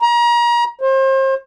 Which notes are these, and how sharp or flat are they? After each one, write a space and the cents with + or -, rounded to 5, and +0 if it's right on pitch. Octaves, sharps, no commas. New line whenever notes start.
A#5 +35
C5 +35